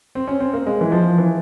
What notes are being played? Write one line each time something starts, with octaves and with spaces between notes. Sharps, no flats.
C4
C#4
C4
A#3
G#3
E3
F3
E3